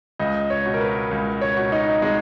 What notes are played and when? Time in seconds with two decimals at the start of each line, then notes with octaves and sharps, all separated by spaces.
0.19 C#2 D#5
0.50 C#5
0.66 B2
0.74 A#4
0.81 B4
1.11 C#2
1.41 C#5
1.57 B2
1.72 D#4
2.02 G#3